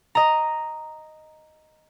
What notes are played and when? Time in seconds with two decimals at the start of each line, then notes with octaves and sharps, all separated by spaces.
0.15 D#5 A#5